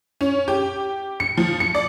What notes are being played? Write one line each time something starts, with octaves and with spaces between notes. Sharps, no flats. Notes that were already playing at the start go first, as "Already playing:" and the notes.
C#4
G4
C#7
F3
C#7
D5